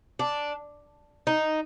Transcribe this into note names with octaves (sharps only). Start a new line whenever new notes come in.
D4
D#4